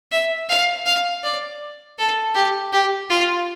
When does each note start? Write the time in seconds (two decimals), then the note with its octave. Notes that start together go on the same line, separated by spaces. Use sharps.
0.12 E5
0.49 F5
0.86 F5
1.23 D5
1.98 A4
2.35 G4
2.73 G4
3.10 F4